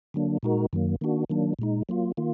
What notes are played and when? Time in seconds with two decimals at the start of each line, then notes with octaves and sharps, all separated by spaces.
0.14 D3 F#3 A#3 D4
0.43 A#2 G#3 D#4 F#4 A#4
0.73 F#2 D#3 F#3 A#3
1.01 D#3 A#3 D4 F#4
1.30 D#3 F#3 A#3 D4
1.59 A#2 G#3 D#4
1.89 F#3 A#3 F4
2.17 D#3 A#3 F4